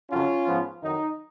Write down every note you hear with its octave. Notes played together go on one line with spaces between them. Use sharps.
F2 C#3 F#3 C#4 F4
G#2 F3 B3
F2 D#3 F#3 D#4